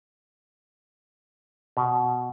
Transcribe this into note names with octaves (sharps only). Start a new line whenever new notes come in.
B2